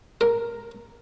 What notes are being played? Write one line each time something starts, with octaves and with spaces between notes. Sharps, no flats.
A#4